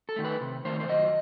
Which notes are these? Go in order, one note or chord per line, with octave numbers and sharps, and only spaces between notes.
A4
D#3 A3
B4
C3
D#3 A3 C5
C5
F#2 D#5